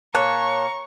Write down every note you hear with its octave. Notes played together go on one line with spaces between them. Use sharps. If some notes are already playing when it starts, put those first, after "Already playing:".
A#2 A#3 C#5 A5 A#5 C#6 F#6